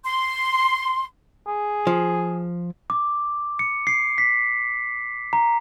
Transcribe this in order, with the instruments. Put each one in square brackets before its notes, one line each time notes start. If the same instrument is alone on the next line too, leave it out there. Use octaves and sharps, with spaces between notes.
[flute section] C6
[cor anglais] G#4
[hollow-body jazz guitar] F3
[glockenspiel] D6
C#7
C7
B6
A#5